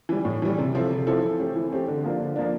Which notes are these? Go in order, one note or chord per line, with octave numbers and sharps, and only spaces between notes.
E3 G3
A2
E3 G3
C3
F3 C4 E4 A4
C3
F3 C4 E4 A4
E3
A3 C4 G4
E3
A3 C4 G4
D3
F3 A#3 D4
D3
F3 A#3 D4